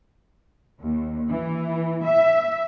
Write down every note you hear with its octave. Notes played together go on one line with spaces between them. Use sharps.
D#2
E3
E5